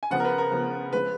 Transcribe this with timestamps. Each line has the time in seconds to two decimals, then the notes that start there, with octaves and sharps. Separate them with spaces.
0.03 G#5
0.11 C#3 F3 B3 F#5
0.20 A#4
0.25 B4
0.38 A#4
0.51 C#3 F3 B3
0.93 C#3 F3 G#3 B4